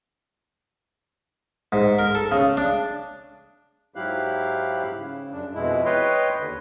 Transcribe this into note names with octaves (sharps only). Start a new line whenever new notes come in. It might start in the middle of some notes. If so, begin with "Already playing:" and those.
G#2
A#4
A4
C#3
D4
G#2 F#3 E4 G4 F5 F#6
C#3
F#2 D4
F2 B2 G#3 E4
B4 C#5 D#5 G5 C6
D#2 D3